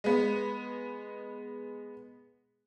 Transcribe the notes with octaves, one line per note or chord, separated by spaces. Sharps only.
G#3 B3